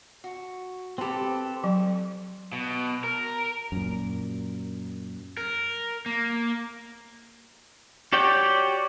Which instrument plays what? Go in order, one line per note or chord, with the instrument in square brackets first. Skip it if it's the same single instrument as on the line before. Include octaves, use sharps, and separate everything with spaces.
[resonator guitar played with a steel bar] F#4
[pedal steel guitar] C4 A4 [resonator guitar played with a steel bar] G4 B4
[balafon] F#3
[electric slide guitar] B2
A#4
[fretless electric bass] F#2 A#2
[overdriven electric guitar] A#4
A#3
[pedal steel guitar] F#4 G4 C#5 D5 G5